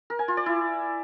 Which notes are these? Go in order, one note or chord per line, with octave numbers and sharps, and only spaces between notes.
A#4
G#5
F4
D5
E4